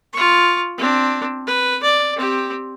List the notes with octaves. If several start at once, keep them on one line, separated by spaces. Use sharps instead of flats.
F4 C#6
C4 D4
B4
D5
C4 G4